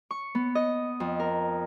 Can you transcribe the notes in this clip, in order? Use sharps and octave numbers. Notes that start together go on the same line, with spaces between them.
C#6
B3
D#5
F2
A#4